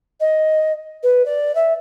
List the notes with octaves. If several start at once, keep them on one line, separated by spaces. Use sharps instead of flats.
D#5
B4
D5
E5